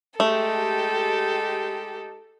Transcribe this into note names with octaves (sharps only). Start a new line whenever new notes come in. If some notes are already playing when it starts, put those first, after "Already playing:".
G#3 A3 D#4 G4 A4